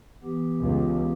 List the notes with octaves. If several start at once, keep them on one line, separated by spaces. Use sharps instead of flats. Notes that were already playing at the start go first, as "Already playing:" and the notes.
E3 B3 G4
C#2